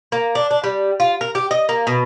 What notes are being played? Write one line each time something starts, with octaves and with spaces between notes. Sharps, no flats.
A#3
D4
D4
G3
F4
A#4
G4
D#5
A#3
B2